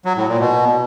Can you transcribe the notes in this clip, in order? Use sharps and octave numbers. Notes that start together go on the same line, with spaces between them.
F#3
A2
A#2
B2